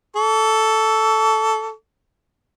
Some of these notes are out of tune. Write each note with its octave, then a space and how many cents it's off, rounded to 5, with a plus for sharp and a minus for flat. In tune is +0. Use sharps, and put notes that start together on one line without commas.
A4 +0 C#6 +40